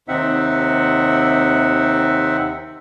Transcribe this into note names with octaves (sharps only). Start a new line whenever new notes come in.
D#2 C3 C4 D#4 E5 F#5